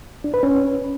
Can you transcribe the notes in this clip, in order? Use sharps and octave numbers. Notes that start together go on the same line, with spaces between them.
D4
B4
C#4